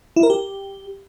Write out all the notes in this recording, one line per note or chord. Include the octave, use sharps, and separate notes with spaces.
E4
A#4
G4